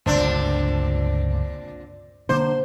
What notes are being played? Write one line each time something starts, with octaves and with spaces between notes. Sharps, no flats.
G1 C#2 A#2 A3 C4 D4
D3 A#3 D4 C5